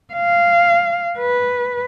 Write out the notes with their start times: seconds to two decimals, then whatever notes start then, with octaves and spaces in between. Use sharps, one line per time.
0.14 F5
1.18 B4